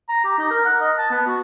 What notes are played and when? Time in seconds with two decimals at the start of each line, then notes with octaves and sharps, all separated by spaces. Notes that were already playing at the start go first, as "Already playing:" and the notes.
0.09 A#5
0.25 G4
0.38 D#4
0.51 A#4
0.65 F#5
0.81 D#5
0.98 A5
1.11 B3
1.27 F#4